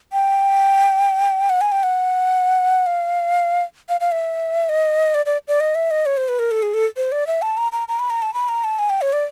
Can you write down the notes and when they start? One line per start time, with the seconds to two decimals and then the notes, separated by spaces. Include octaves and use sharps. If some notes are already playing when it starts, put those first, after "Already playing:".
0.13 G5
1.49 F#5
1.61 G#5
1.72 G5
1.83 F#5
2.86 F5
3.89 F5
4.00 F5
4.12 E5
4.69 D#5
5.14 D5
5.26 D5
5.48 D5
5.60 D#5
5.75 E5
5.91 D#5
6.06 C#5
6.17 C5
6.28 B4
6.39 A#4
6.51 A4
6.62 G#4
6.74 A4
6.97 C5
7.12 D5
7.27 E5
7.42 A5
7.57 A#5
7.72 A#5
7.88 A#5
7.99 B5
8.10 A#5
8.22 A5
8.34 B5
8.48 A#5
8.64 A5
8.79 G#5
8.90 G5
9.01 C#5
9.13 D5